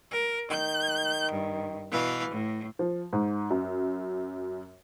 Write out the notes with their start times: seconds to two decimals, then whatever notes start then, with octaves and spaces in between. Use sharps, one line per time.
0.12 A#4
0.50 D#3 G6
1.32 G2
1.92 B2 E3 F5
2.30 A2
2.79 F3
3.13 G#2
3.51 F#2